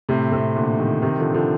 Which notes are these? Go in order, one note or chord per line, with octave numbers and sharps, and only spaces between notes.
A2 C3
A2 C3
A#2 D3
C3 D#3
C3 D#3
D3 F3
D3 F3